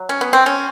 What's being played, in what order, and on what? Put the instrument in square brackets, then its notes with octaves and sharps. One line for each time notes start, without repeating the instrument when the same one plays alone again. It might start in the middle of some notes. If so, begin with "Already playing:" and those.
Already playing: [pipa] F#3
C#4
B3
C4
C#4